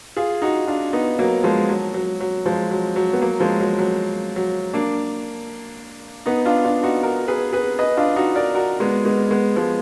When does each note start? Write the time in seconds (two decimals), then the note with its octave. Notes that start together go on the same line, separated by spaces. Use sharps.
0.17 F4 G#4
0.42 D#4 F#4
0.67 D4 F4
0.93 B3 D#4
1.19 F#3 A#3
1.44 F3 G#3
1.69 F#3
1.94 F#3
2.20 F#3
2.46 F3 G#3
2.71 F#3
2.96 F#3
3.13 B3
3.22 F#3 A#3
3.40 F3 G#3
3.60 F#3
3.79 F#3
4.36 F#3
4.74 A#3 D4
6.26 B3 D#4
6.45 D4 F4
6.64 D4 F4
6.83 D#4 F#4
7.03 F#4 A#4
7.28 G#4 B4
7.53 G#4 B4
7.79 B4 D#5
7.97 D4 F4
8.16 D#4 F#4
8.35 A#4 D5
8.55 F#4 A#4
8.80 G#3 B3
9.05 G#3 B3
9.31 G#3 B3
9.56 F3 G#3